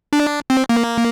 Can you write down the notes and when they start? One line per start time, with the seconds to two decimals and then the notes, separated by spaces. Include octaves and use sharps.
0.13 D4
0.50 C4
0.69 A#3